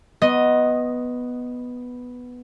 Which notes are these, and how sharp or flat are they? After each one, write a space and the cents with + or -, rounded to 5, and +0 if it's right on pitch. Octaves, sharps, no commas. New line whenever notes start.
B3 +0 D#5 +0 C6 +35